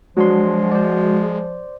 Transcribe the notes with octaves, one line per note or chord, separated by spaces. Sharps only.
F3 F#3 G#3 D4 F#4 C6
C5 D5